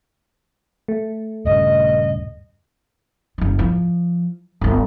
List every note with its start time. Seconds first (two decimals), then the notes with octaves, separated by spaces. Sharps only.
0.88 A3
1.45 D#1 G2 C#3 D#5
3.38 F#1 D#3
3.59 F3
4.61 G1 D2